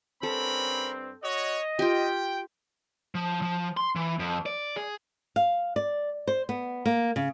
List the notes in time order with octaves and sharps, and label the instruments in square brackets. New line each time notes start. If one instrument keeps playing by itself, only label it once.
[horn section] G2 C4 [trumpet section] C#4 A#4 B5 [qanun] A4
[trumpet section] F#4 C#5 [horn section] D#5
[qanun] F4 G4 [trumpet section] G5
[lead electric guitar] F3
F3
C6
E3
F2
D5
G#4
[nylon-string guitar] F5
D5
C5
B3
A#3
C#3